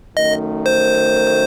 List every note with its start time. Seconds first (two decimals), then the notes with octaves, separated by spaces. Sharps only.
0.17 F#2 D#3 A3 D#5
0.66 C5